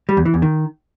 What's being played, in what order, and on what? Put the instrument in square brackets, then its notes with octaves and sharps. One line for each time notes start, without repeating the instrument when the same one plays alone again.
[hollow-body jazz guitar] G3
E2
E3
E2
D#3